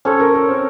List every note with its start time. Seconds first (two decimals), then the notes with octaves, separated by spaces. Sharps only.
0.05 C#4 A4 C5 C#5
0.20 A#4
0.35 A#4
0.49 C4